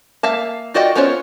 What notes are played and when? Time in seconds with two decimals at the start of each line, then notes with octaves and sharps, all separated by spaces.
0.23 A#3 E5 F5 A5
0.74 F4 F#4 D5 D#5 G5
0.95 B3 C#4 F4 C5 C#5